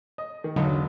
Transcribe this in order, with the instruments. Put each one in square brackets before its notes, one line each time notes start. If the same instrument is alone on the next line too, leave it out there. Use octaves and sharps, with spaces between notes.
[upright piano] D#5
D#3
[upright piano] E1 B1 D#4 [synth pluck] D3 F#3